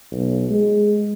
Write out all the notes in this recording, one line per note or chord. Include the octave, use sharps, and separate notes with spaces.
B1
G#3